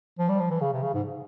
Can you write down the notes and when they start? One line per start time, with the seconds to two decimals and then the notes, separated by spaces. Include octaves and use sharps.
0.19 F3
0.29 G3
0.40 F3
0.50 E3
0.61 C#3
0.73 C3
0.82 C#3
0.94 G#2